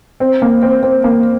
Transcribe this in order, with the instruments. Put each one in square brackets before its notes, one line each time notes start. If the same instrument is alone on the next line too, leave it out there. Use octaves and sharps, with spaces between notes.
[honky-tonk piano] C4
A#3
C4
C4
A#3